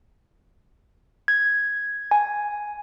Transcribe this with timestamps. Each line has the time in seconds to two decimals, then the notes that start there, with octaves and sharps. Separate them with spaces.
1.28 G#6
2.11 G#5